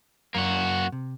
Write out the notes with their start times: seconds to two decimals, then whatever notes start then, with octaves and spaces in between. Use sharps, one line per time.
0.35 F#2 A#3 F#4
0.92 C3